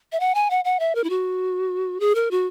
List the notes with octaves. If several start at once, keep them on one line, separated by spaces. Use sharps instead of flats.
E5
F#5
G#5
F#5
F#5
E5
A#4
E4
F#4
G#4
A#4
F#4